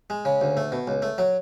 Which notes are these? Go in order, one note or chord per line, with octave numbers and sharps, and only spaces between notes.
G#3
C#3
D2
A3
B2
C#2
A3
F#3